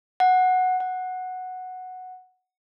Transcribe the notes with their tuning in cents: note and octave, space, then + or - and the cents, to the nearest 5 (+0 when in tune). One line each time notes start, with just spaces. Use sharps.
F#5 -5
F#5 -5